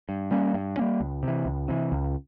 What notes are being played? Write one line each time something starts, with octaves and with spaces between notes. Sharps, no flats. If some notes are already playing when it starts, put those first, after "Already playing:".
G2
G3 A#3 C#4
G2
G3 A#3 C#4
C#2
C3 E3
C#2
C3 E3
C#2